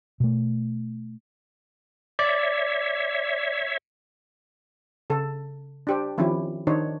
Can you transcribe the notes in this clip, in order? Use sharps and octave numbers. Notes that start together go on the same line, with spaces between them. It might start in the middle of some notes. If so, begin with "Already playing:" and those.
B2 A3
C#5 D5 E5
C#3 A4
D4 G4 C5
D#3 F3 C4 C#4 E4 G4
D#3 D4 D#4 C5 C#5